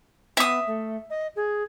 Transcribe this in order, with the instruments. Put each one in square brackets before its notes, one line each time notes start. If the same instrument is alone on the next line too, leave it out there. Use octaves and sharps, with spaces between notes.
[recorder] B3 [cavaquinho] E5 D#6
[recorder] A3
D#5
G#4